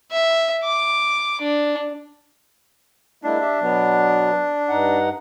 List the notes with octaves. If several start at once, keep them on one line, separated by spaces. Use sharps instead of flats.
E5
D6
D4
G#3 A#3 D4 E4
G4 E5
B2 F#3 B3
G2 D#4 F#5